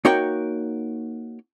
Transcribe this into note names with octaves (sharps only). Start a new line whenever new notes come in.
A#3 D#4 F#4 A#4 C#5 G5